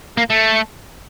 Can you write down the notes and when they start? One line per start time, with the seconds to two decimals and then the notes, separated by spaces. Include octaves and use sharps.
0.17 A#3
0.30 A3